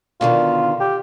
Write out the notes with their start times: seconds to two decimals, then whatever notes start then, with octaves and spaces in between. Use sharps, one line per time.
0.21 B2 D3 D#3 F4
0.80 G4